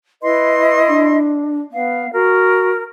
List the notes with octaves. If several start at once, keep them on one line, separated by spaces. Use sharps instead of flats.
E4 B4 D#5 C6
D4
B3 F5
F#4 A#4